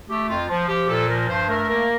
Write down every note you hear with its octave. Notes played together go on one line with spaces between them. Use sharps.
A3 G4
F2 F4
F3
F3 G4
A#2 A4
F3 A#4
G2 C5
A3 A#4
A#3 A#4